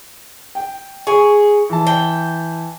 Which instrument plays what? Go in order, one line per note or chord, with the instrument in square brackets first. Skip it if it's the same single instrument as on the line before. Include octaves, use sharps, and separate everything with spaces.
[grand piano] G5
[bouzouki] G#4 [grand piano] C#6
[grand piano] E3 A5
[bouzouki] G5